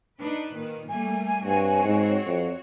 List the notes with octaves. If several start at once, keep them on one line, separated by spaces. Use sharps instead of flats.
D4 D#4 B4
A#2 D#3
G3 A3 A#3 G#5
G2 C4 F#4 C#5
G#2
F2